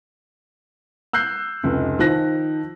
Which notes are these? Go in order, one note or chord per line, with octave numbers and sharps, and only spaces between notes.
E6 F#6 G6 C7
F1 C#2
D#3 F3 F#6 A#6